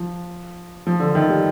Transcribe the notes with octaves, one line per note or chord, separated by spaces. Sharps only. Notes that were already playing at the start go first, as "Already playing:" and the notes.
Already playing: F3
F3
D3
D#3
G3